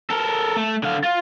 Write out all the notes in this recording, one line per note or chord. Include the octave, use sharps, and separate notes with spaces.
A4 A#4
A3
D3 F5
F4